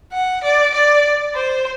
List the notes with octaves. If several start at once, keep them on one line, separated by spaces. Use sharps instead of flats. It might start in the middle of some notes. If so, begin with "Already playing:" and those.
F#5
D5
D5
C5